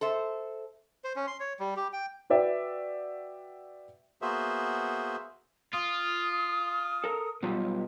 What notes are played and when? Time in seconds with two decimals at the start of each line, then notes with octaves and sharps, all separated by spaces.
0.01 A4 C5 E5
1.04 C5
1.16 C#4
1.27 C6
1.40 C#5
1.59 G3
1.76 G4
1.93 G5
2.30 F#4 B4 D5 E5 G5
4.22 A#3 B3 F#4 G#4 C5 E5
5.73 F4 D#6
7.04 A4 A#4
7.43 B1 G3 F4 G4